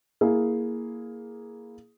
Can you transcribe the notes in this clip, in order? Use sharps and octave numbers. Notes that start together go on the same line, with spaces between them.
A#3 E4 G#4